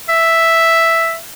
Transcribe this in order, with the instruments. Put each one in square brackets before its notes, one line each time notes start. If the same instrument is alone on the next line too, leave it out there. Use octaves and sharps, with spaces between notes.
[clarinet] E5